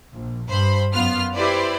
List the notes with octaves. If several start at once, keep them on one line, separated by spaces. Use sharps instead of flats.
A#1
G2 C5 B5
F#2 B3 F4 F6
E4 G4 B4 C5 D5